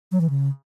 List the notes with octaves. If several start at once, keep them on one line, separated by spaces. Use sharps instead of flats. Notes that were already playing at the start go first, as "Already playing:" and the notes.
F#3
E3
C#3